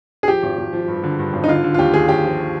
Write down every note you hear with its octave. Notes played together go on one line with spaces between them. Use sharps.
G#4
F3 G4
G#1
G#1
F3
G2
D3
G2
G#1
D#4
D3 F4
D3
F4
D#2 G4
D#2 G#4
D#2 G4
F3